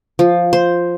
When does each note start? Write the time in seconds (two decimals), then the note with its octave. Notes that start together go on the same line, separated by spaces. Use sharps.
0.19 F3
0.53 C5